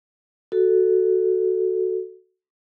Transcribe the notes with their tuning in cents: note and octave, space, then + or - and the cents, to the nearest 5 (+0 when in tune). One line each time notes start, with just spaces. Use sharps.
F#4 +5 A4 +0